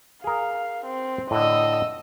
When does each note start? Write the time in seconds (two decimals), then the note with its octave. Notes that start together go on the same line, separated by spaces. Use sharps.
0.24 G#4 A#4 F5
0.85 C4
1.31 A2 D3 D#5 E6